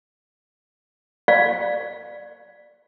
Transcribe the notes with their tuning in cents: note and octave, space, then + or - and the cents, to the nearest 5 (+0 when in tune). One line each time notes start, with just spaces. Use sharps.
D5 +10 F5 +20